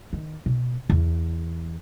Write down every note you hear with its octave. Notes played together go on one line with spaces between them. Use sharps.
D#3
B2
E2